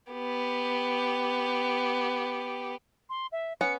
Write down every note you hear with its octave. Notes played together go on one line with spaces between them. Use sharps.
B3 G4
C6
E5
B3 C#4 F#5 C#7